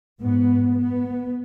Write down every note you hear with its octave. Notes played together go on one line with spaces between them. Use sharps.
G#2 B3
B3